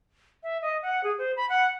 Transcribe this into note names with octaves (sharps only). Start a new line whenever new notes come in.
E5
D#5
F#5
G#4
C5
B5
F#5